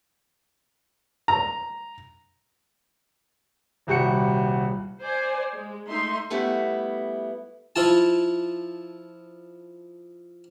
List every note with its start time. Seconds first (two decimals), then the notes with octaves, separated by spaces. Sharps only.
1.28 A#5
3.87 D#1 C2 G3 F#4 C#7
5.02 C5 D5 G#5
5.54 G#3
5.87 A3 D#4 E5 C6
6.30 G3 A3 B3 E4 F#4
7.76 F3 E4 F4 A5